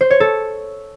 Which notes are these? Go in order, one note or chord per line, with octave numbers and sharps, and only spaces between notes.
C5
C#5
A4